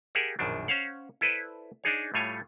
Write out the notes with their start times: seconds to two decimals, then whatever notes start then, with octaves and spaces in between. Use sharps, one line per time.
0.15 G4 G#4 A#4 E5 F#5
0.39 A#1 F#2 B2 D#3 D4
0.68 C#4 C5 C#5 F5 F#5
1.21 E4 A4 B4 C5 D5
1.84 D4 D#4 G#4 C#5
2.14 A2 G3 A3 F4 C#5 G#5